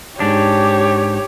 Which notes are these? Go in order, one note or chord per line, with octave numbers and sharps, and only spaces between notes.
G#2 D4 G4 C#5